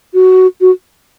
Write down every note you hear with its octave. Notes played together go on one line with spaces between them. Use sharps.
F#4
F#4